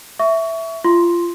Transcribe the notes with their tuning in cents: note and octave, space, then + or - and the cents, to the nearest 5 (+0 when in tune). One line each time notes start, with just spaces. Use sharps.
E5 +0 C#6 +25
F4 -20 C6 +0